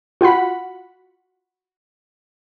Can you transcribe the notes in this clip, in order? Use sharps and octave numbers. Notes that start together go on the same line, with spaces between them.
F4 F#4 F#5 B5